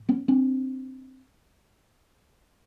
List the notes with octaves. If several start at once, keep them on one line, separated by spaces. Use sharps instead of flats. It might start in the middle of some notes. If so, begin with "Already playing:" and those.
Already playing: A2
B3 C#4
C4 D4